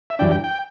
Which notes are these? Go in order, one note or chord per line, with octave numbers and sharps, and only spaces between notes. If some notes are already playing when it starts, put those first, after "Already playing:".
E5
F#2 E3 G3 D4 G5
G5
G5